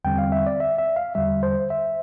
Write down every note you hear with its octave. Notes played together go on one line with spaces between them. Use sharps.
E2 D3 G3 C4 G5
F5
E5
D5
E5
E5
F5
E2 D3 G3 E5
C5
E5